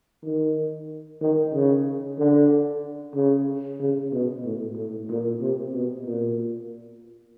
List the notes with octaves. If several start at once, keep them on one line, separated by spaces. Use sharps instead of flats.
D#3
D#3
C#3
D3
C#3
C#3
B2
A2
A2
A#2
C3
B2
A#2